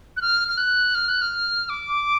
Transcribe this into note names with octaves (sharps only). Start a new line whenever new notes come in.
F#6
F6
F6
F#6
F6
F#6
F6
D6